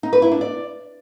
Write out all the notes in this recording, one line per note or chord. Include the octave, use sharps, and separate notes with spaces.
D#4
B4
E4
D4
D5